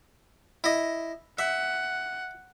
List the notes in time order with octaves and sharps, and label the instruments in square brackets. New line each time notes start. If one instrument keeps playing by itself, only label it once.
[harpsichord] E4 D#5
[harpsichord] E5 [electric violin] F#5